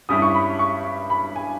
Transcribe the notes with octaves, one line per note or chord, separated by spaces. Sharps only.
G2 G3 C#4 E4 D#6
C#6
B5
C#6
B5
G#5